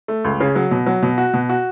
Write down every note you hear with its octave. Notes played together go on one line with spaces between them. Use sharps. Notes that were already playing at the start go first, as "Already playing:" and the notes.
A3
C#2
C#3
F#3
B2
F#3
B2
F#4
B2
F#4